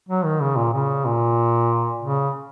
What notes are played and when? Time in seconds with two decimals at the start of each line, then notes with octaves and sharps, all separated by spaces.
0.09 F#3
0.25 D#3
0.41 C#3
0.57 A#2
0.74 C#3
1.05 A#2
2.02 C#3